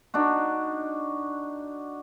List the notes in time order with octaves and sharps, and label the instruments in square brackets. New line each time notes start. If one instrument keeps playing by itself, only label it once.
[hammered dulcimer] D4 D#4 F#4